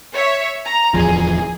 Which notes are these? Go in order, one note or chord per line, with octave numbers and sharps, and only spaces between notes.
C#5 E5
A#5
D1 E2 F3 G#4